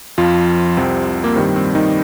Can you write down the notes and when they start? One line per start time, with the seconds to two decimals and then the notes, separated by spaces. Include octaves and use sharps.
0.18 F2 F3 F4
0.77 C2 C3 F3 C4
1.24 A#3
1.36 G2 D#3 G3 C4
1.56 C4
1.75 D#3 D#4